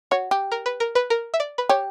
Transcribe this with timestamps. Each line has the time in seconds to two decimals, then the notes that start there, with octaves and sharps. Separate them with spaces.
0.11 F#4 C#5
0.31 G4
0.52 A#4
0.66 B4
0.80 A#4
0.95 B4
1.10 A#4
1.34 E5
1.40 D5
1.58 B4
1.69 G4 C#5